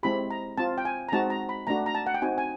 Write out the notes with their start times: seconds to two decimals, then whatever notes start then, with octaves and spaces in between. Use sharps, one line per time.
0.03 G#3 C4 E4 G4 B5
0.30 A#5
0.58 C4 F4 A5
0.78 G5
0.85 G#5
1.08 A#5
1.12 G#3 C4 D#4 F#4 A5
1.30 A#5
1.49 B5
1.67 A3 D4 F#4 A#5
1.86 A#5
1.95 A5
2.06 F#5
2.14 G5
2.22 C4 D#4 F#4 G#5
2.38 G#5